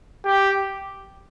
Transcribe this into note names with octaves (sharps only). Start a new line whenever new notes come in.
G4